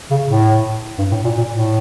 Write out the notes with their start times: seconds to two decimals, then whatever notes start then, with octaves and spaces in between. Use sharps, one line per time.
0.11 C#3
0.29 A2
0.98 G2
1.12 A2
1.25 A#2
1.38 A#2
1.51 A2